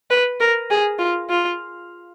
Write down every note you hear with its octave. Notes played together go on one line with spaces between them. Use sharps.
B4
A#4
G#4
F4
F4